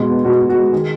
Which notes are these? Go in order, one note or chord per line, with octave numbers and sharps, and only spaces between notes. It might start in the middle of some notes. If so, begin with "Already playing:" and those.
Already playing: B2 G#3
B3
B2 F#4
B2
F#4
G#3
D#3 G#4